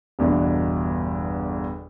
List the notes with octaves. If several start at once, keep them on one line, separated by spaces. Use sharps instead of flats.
G1 E2 B2 D3 D4 E5